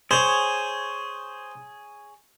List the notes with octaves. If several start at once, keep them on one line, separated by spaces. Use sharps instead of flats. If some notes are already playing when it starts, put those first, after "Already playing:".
G#4 C5 C#5